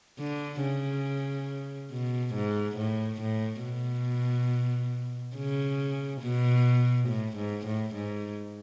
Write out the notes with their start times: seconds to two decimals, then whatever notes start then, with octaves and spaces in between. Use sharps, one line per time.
0.19 D3
0.62 C#3
1.91 B2
2.34 G#2
2.77 A2
3.21 A2
3.63 B2
5.36 C#3
6.22 B2
7.08 A2
7.36 G#2
7.66 A2
7.94 G#2